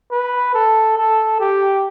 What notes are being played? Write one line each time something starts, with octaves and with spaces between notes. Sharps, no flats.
B4
A4
A4
G4